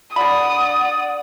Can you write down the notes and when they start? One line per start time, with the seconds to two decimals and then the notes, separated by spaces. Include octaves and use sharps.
0.16 D3 D5 F#5 B5 D#6